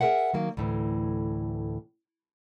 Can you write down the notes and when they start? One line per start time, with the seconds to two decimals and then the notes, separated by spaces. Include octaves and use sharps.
0.01 G#4 A#4 C5 E5 F#5
0.34 D#3 F#3 A#3
0.57 D2 A2 E3